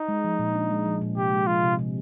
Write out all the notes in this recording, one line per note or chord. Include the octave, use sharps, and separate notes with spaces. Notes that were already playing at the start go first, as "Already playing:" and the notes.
Already playing: D#4
G#3
F3
A#2
D4
G#3
F3
A#2
C3 G4
G#3
F3 F4
C3
C3